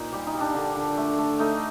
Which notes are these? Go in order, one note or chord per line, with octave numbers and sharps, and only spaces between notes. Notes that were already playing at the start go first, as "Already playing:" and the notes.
Already playing: A#2 D#4 C5
G3 G4
D#4
G3
D4
D3
D3
A3
A3
A3 D#4